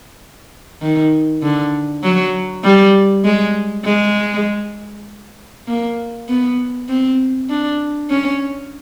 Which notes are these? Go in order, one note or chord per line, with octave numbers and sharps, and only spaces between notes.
D#3
D3
F#3
G3
G#3
G#3
A#3
B3
C4
D4
C#4